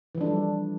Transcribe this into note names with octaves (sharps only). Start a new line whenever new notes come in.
E3 F3 G3 D4 A4